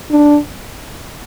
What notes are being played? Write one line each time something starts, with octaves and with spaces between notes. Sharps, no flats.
D4